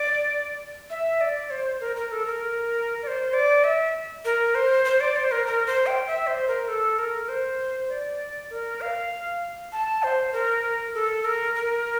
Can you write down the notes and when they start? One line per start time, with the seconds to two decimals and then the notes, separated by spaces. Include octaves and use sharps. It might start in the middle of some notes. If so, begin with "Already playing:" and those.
Already playing: D5
0.90 E5
1.21 D5
1.51 C5
1.81 A#4
1.96 A#4
2.12 A4
2.26 A#4
3.03 D5
3.07 C5
3.33 D5
3.64 E5
4.25 A#4
4.55 C5
4.85 C5
5.00 D5
5.16 C5
5.32 A#4
5.47 A#4
5.67 C5
5.87 G5
6.07 E5
6.27 C5
6.48 A#4
6.68 A4
6.99 A#4
7.29 C5
7.89 D5
8.50 A#4
8.81 F5
9.72 A5
10.03 C5
10.33 A#4
10.94 A4
11.25 A#4
11.55 A#4